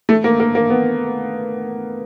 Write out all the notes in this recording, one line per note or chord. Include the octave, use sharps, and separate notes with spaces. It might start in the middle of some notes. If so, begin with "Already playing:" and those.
A3
A#3
A#3
A#3
B3